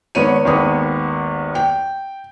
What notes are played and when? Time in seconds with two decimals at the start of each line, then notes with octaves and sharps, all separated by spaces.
0.15 G#1 B3 C#5 D#7
0.45 G#1 D#2 B3 D#6
1.55 G5